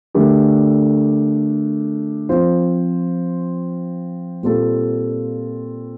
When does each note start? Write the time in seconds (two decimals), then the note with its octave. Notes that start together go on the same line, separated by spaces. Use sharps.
0.15 D3 A3 D4 G4 A#4
2.29 F3 C4 F4 C5
4.43 A#2 G3 C4 F4 A4